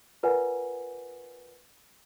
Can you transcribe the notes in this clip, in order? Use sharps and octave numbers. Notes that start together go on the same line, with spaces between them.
F4 A#4 B4 D5 F#5 G#5